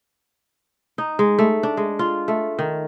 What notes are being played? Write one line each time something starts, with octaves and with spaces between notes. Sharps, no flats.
D#4
G#3
A3
D4
G#3
F4
A3
D#3